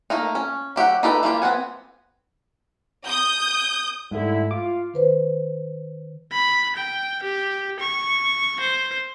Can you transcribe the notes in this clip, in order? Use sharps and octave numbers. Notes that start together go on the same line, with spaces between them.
A3 A#3 D#4
C#4
F#3 G4 E5 F#5
D#4 G4 A4 B4
E3 A#3 F4 G4
B3 C4 F#5 G#5
D#6 G6
G#2 D3 G3 A3 E4
F4 D6
D#3 B4 C5
B5
G5
G4
C#6
C5